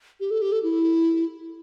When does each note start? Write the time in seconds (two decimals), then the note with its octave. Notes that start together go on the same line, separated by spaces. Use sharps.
0.20 G4
0.31 A4
0.42 G4
0.52 A4
0.63 E4